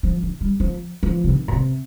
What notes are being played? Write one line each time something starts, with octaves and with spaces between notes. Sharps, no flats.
F3
D#3
G3
F3
F3
C3
D#3
A#2
C3